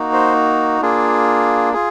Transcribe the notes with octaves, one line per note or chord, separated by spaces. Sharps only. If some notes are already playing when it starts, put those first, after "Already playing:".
Already playing: A#3 D#4 F#4
C5
A#3 D4 F4 G#4
F4 G#4